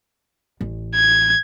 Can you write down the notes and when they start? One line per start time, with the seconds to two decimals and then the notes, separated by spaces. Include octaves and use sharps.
0.61 A1
0.95 G#6